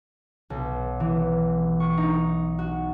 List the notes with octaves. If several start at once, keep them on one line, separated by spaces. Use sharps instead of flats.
B1
E3
C#6
D#4
F#4